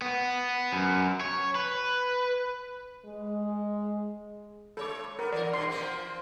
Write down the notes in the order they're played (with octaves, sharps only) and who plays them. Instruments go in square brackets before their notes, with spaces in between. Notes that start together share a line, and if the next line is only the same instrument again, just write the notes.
[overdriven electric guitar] B3
F#2
C#5
B4
[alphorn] G#3
[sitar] G#3 C#5 [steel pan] A4 D6
[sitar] B3 [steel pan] A#4
[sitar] E3 A#4 [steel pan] D5
[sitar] G2 B2 E3 [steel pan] C6
[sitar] F3 A#3 C4